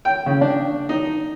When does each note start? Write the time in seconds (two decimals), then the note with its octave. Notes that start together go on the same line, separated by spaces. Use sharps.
0.05 G5
0.26 C#3
0.41 D4
0.89 D#4